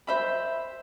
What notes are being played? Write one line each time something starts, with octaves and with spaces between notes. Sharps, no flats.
C5 E5 B5